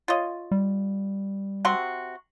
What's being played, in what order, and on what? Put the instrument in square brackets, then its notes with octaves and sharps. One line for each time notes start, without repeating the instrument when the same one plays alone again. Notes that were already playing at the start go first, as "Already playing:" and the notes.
[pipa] F4 C#5 D#5
[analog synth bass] G3
[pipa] C3 F#4 C6